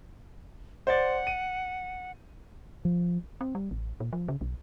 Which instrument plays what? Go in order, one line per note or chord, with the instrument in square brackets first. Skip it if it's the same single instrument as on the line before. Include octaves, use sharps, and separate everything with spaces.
[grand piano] C5 D5 A6 [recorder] F#5
[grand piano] D#7
[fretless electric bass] F3
[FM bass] C4
G3
A1
A#2
F3
C#3
B1